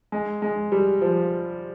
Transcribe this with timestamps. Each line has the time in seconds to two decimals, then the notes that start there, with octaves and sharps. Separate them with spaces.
0.12 G#3
0.42 G#3
0.72 G3
1.01 F3